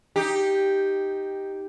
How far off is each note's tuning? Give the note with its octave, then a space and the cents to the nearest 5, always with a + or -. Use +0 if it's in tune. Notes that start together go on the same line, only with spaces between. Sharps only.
D#4 +0 G4 +0